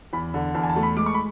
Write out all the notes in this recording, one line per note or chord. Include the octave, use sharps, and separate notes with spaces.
E2 B5
D3
E2 A5
G#5
A5
A3
B5
G#3 D6
C#6
B5